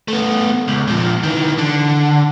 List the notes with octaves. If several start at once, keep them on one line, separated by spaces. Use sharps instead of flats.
A3 B3
C#2
A#2 F3
D#3 E3
D3